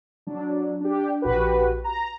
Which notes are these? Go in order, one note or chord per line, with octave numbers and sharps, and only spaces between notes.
F#3 D4
D4 G4
A#1 F#4 G4 B4
A#5